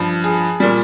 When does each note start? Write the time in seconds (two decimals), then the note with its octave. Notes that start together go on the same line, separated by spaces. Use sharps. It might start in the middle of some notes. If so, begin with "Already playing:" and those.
Already playing: G2 F3
0.24 G#4
0.60 A#2 G3